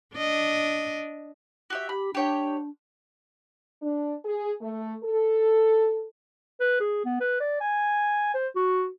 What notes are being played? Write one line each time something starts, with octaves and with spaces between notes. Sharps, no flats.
D4 D#5
F#4 G4 E5
G4 B5
D4 G4 C#5 G5
D4
G#4
A3
A4
B4
G#4
B3
B4
D5
G#5
C5
F#4